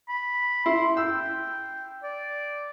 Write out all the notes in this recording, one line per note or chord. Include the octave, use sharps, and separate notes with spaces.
B5
E4 C6
G5 E6
D5